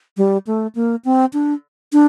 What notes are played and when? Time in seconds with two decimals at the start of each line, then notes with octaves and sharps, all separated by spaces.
0.17 G3
0.47 A3
0.75 A#3
1.05 C4
1.33 D4
1.93 D4